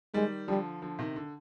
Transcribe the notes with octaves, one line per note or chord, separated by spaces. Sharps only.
D#3 G3 G#3
D3 F3 G3
D3 F3
C3 D#3
D3